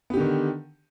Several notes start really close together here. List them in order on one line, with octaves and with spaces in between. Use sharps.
B3 G4 D3 D#3